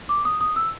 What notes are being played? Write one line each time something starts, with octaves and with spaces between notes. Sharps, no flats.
D6
D#6
D#6
E6